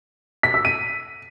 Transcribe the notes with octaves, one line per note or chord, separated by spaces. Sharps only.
B6
E6
D#7